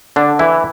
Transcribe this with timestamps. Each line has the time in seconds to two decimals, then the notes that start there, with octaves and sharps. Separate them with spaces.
0.16 D3 D4
0.39 E3 E4